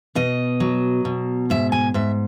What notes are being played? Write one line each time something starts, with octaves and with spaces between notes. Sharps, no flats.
B2 D#5
F#3
B2
G#2 E5
G#5
G#2 E5